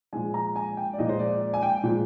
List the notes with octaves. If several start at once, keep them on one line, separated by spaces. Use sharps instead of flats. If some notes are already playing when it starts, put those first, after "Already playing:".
A#2 F3 G#3 G#5
A#5
G#5
G5
D5
A#2 F3 G#3 D#5
C5
D5
D5
G#5
G5
A#2 F3 G#3